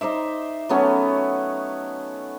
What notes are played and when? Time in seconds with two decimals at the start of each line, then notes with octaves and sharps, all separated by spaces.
0.01 D#4 C5 D5 E5
0.69 F#3 A3 B3 C#4